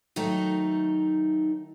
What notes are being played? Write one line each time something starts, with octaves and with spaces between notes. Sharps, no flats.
D#3 F#3 A3 D#4